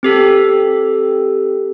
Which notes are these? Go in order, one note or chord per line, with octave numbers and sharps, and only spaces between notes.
C4 G4 A4